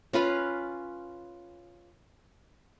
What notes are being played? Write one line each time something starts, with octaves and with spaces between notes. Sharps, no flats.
C#4 F4 B4 F5